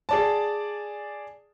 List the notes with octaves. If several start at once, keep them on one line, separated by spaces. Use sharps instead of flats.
G#4 D5 A5